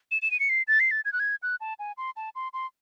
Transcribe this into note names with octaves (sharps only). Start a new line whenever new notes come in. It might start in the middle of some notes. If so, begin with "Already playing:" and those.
E7
E7
D#7
C#7
C7
A6
C7
A6
G#6
F#6
G#6
F#6
A5
G#5
C6
A5
C6
C6